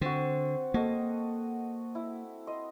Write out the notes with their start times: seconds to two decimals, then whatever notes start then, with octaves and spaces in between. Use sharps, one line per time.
0.01 D3 C4 F#4
0.74 A#3 F#4 A4 D#5
1.95 E4
2.47 D#5 C6